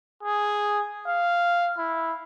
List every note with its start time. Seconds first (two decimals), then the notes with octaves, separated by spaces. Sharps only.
0.23 G#4
1.07 F5
1.78 E4